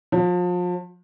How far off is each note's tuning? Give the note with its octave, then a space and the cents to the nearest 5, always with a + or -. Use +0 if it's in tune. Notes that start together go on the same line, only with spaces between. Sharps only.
F3 +35